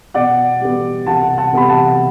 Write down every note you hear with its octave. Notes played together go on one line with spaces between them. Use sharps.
B2 D5 F#5
G3 B3
C2 F#5 A5
F#5 A5
C3 G3 B3 B5
F#5 A5